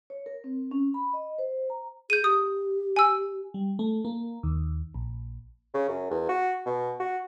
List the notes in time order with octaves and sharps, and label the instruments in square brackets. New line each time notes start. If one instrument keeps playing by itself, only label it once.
[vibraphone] C#5
A#4
C4
C#4
B5
D#5
C5
A#5
[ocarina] G#4 [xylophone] G6 D#7
[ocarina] G4 [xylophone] D#6
[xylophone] G#5 E6
[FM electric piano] G3
A3
A#3
D#2
A#1
[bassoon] C#3
F#2
E2
F#4
B2
F#4